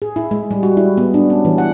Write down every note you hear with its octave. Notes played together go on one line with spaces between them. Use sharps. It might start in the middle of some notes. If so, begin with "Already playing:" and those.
G#4
E4
G#3
G3
F#4
E4
B3
D4
C#4
E3
F#5